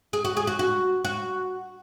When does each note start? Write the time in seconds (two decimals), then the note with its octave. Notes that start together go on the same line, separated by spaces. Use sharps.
0.13 G#4
0.25 F#4
0.37 G#4
0.47 F#4
0.59 F#4
1.05 F#4